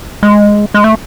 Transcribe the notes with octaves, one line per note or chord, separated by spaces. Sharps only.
G#3
G#3
A3